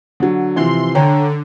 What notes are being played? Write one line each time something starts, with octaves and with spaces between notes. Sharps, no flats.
D3 F#3
C3 E3 F3 C6
D3 C#5 G5 A#5